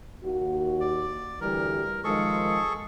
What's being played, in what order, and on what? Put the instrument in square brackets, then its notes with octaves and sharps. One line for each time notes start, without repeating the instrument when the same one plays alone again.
[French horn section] D#2 F#4
[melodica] D5
[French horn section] D2 E3 G3 [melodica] A#4
[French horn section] D#3 F3 G#3 [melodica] G#4 A4 C#6